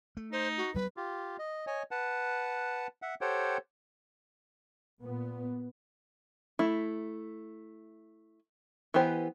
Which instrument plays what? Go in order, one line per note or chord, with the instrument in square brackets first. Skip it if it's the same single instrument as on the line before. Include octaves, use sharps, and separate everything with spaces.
[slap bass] A3
[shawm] D#4 [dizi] C5
[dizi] F#4
[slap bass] D2 F#3 B3 [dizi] B4
[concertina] F4 G4
D#5
C#5 D#5 G#5
B4 F#5 A5
E5 F#5
G4 A4 C5 C#5 F#5 G5
[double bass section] A#2 B3
[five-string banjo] A3 E4
E3 B3 G4 C5